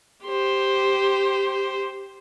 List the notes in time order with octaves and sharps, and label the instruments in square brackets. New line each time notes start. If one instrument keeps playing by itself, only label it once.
[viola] G4 C5